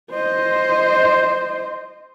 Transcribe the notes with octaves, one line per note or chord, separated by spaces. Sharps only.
C5 D#5